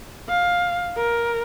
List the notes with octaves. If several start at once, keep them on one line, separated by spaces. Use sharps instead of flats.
F5
A#4